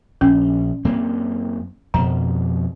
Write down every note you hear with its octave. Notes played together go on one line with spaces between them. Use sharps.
A#1 C#4
F#2 A#3 C4
F2 B2 A#5